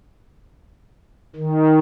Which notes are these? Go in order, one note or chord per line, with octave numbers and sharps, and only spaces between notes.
D#3